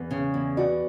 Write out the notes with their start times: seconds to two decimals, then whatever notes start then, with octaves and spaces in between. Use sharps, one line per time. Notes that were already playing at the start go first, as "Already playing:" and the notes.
Already playing: E2 B4
0.11 C#3
0.34 E2
0.57 F#4 B4 D5